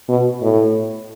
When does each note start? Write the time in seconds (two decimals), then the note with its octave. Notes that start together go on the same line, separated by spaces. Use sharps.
0.09 B2
0.42 A2